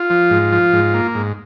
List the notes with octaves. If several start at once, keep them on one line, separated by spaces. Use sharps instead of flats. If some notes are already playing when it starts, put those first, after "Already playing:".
Already playing: F4
F3
G#2
F3
G#2
A#3
G#2